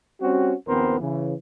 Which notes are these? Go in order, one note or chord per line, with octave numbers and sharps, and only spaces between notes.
G3 C4 C#4 F#4
A#1 D#2 B3 C4 A#4 C5
C#3 E3